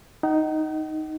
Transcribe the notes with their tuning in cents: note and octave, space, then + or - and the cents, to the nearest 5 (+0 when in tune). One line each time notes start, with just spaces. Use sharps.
D#4 +0 F#5 +45